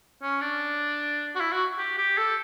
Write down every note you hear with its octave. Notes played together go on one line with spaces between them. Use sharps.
C#4
D4
F#4
E4
F#4
G4
G4
A4